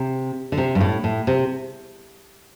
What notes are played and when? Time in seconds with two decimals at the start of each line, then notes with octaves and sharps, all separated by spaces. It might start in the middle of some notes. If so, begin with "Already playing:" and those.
Already playing: C3
0.52 D3
0.58 C3
0.75 G2
0.81 A2
1.04 A2
1.27 C3